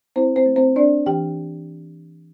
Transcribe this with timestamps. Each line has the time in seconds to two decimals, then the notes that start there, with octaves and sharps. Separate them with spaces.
0.16 C4 E4 C5
0.36 C4 C5
0.46 A3
0.56 C4 C5
0.76 C4 D4 D5
1.06 E3 G4 G5